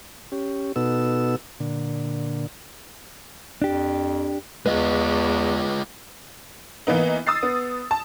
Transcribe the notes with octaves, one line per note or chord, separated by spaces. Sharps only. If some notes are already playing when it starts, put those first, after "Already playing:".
C#4 G4
B2 B3 D#4 F#4 A4 E6
A#2 D3
F2 D4 G4
E2 G#3 F4 B4 D#5
E3 A#3 B3 D#4
D#6 E6 A6 C7
B3
A5